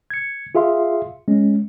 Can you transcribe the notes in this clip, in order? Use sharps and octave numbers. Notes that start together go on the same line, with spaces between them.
G#6 C#7
F4 G#4 E5 F5 C6
G#3 C#4